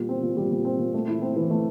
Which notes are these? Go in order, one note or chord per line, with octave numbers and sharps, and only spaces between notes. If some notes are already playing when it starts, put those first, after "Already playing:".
Already playing: A#2 G3
C4
A#2
G3
A#2
C4
A#2
A3
E4
C4
E3
A3